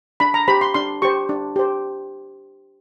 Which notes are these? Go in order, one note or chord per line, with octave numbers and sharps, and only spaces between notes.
D4 B5
A#5
G4 C5 B5
C6
D4 C6
G4 C5 C#6
D4
G4 C5